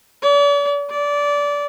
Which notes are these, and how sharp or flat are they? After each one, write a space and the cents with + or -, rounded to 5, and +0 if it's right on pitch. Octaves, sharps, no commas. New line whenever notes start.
D5 -45
D5 -20